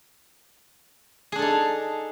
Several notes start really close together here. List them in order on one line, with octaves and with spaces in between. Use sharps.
G#4 D4 A4 D#4